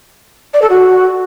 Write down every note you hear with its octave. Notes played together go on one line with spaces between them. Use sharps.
D5
A4
F#4